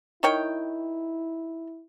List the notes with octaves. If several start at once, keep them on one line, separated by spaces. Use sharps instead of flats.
D#3 E4 C#5 G5